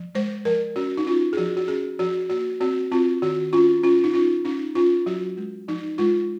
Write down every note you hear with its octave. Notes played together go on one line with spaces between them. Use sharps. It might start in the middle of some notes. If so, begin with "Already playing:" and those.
Already playing: F3
G#3 C5
F3 A#4
C#4 F#4
D#4
C#4 F4
G#4
F3 F#4
F#4
C#4 G#4
F3 F#4
A#3 F#4
C4 F#4
C4 F4
D#3 F#4
C#4 F4
C#4 F4
D#4
C#4 F4
C#4 D#4
C#4 F4
F#3 F#4
G#3
F3 D#4
G#3 F4